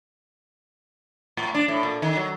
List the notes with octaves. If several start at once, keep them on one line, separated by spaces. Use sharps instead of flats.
A2
D4
A2
A#2
D#3
F#3